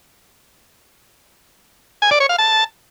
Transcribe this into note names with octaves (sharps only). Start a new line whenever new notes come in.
G#5
D5
C#5
F5
A5